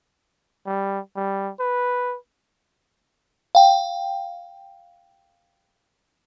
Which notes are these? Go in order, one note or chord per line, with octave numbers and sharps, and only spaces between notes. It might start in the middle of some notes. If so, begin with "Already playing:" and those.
G3
G3
B4
F5 G5